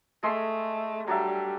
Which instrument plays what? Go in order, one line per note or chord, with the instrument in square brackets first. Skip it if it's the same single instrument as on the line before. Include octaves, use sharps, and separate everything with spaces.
[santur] G#3 A4 C6 [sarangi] A3
[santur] F#3 D4 E5 [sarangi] G3